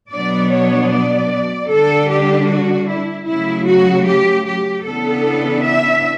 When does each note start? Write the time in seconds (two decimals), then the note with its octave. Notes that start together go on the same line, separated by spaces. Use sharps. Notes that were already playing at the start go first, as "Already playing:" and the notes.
0.12 B2 F#3 B3 D4 D5
0.51 C#5
0.91 D5
1.69 D3 G3 D4 A4
2.10 G4
2.49 F#4
2.89 E4
3.27 C#3 F#3 A3 E4
3.67 F#4
4.06 G4
4.46 G4
4.85 C#3 E3 B3 D4 A4
5.65 E5